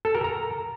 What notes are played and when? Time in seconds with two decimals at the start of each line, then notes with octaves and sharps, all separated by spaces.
0.05 A4
0.15 A#4
0.24 A#5